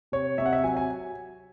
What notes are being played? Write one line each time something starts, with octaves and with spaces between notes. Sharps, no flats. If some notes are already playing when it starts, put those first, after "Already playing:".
C3 C#5
C3 E5
F#5
E5
F#3 G#5
G#5